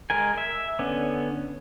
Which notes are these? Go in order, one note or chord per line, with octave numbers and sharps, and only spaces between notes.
G#3 A#4 G#5
E5
D3 B3 C#4